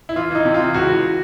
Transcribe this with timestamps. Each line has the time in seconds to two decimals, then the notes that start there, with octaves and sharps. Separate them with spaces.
0.09 E4
0.16 E3 F4
0.31 E3 D#4
0.45 C3
0.54 F4
0.60 E3
0.74 C#2 F#4
0.89 E3